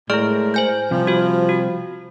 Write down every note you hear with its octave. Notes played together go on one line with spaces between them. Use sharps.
A2 G#3 G#4 A#4 D5 F6
C5 G#5 G6
C3 F3 G3
F#4 C5
F#4